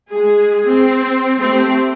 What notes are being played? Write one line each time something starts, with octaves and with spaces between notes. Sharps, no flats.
G#3 G#4
C4
A3 C4 G4